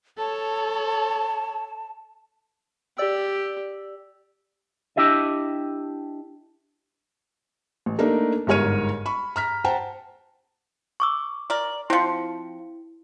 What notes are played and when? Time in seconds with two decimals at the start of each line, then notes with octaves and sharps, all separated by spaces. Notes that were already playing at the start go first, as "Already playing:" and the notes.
0.18 A4 C#5 A5
2.98 G4 D5 E6
4.96 D4 E4 G4 D#5 E5
7.86 A1
7.99 A3 A#3 D4 D#4 A#4
8.47 G1 G#2 A#4 C#5 F6 D#7
9.06 B5 C#6
9.36 A#5 F6 B6
9.64 C5 F#5 G5 A5 A#5
11.00 C#6 D6 E6
11.50 A#4 D5
11.90 F3 C4 E4 C#7